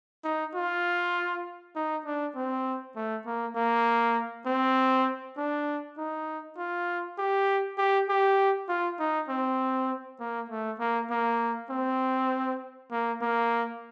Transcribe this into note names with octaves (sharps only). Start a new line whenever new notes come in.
D#4
F4
D#4
D4
C4
A3
A#3
A#3
C4
D4
D#4
F4
G4
G4
G4
F4
D#4
C4
A#3
A3
A#3
A#3
C4
A#3
A#3